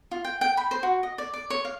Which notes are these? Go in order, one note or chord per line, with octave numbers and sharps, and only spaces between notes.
F4
G5
G5
B5
C5
F#4
D#5
D5
D5
C#5
F5